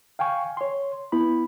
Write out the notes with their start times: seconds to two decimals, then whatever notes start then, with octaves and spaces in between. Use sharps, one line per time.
0.19 F5 G5 G#5 C#6
0.57 C#5 C6
1.12 B3 E4 B5